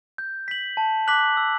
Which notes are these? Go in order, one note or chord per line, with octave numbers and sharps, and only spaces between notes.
G6
B6 F#7
A5
D6 F#6 B6 F#7
E6